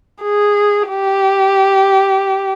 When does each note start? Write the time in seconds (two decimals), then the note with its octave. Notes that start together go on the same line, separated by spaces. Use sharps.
0.23 G#4
0.89 G4